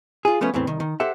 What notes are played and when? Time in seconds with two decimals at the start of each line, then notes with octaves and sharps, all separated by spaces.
0.25 F4 G#4
0.41 F3 A3 B3 C#4
0.54 E2 A2 E3 C4
0.67 C2 D#3
0.80 D#3
1.00 G4 A4 C5 E5 F#5